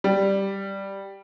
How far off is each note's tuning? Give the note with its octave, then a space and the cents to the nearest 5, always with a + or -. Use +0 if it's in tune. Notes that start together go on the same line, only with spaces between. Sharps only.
G3 +0